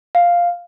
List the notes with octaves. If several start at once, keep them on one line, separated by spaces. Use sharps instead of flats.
F5